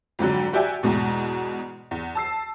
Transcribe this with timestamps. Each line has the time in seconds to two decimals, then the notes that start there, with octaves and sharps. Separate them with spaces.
0.19 F2 G#2 D3 F#3
0.53 F#4 G4 D5 E5 G5 G#5
0.83 E2 G#2 B2
1.91 E2
2.15 A5 E6 C7